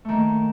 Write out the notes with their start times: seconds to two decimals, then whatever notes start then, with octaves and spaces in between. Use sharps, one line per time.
0.05 A3
0.09 D#3
0.12 A#3